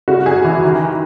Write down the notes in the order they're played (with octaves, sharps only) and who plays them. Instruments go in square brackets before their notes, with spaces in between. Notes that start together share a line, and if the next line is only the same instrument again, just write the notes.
[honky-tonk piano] C#3 F#4
F#2 G#4
E3
D#3